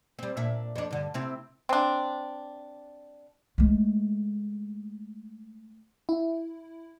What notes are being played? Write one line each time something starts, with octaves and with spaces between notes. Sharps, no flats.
G3 C4
A#2 D4 E5
F2 D4
G2 D3
C3 C4 E4
C4 D4
G#3 A3
E4